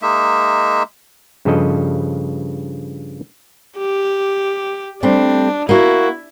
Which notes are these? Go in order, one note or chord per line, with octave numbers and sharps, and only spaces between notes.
G#3 A#3 D#4 E5
G2 C#3 F3 A4 D#5
G4
G3 A3 C4 D4
A#3 E4 F#4